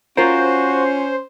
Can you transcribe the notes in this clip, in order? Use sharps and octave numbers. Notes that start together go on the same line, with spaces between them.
C#4 F4 F#4 A#4 C5